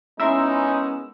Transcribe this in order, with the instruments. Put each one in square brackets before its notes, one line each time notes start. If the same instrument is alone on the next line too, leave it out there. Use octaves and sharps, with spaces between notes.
[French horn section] G#3 B3 C#4 [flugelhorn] D#4 [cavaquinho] E4 A#4 C6 [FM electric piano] E6